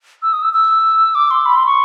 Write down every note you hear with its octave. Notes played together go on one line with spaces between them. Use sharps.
E6
D#6
E6
E6
D6
C6
B5
C6
C#6